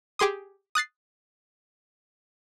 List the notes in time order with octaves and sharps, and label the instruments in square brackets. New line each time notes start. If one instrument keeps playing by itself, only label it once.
[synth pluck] G4 G#4 C6 D#6
D#6 F#6 A6 C7